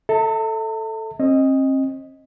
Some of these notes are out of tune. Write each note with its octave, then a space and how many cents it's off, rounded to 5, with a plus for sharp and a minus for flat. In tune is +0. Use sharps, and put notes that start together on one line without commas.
A4 +0 E5 -30 A5 +45
C4 +40 D#5 +0